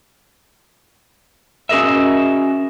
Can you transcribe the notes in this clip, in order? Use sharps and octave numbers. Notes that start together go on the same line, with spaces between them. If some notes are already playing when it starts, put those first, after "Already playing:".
C#4 F#4 G#4 A#4 D#5 E5